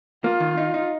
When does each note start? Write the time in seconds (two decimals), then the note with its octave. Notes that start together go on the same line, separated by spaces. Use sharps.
0.24 A#3 F4
0.40 D#3
0.57 D#4
0.74 D#4